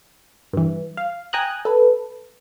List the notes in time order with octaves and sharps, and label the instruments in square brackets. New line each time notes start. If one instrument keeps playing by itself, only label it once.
[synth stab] G2 E3
F5
G5 G#5 A#5 D#6 F#6
A4 B4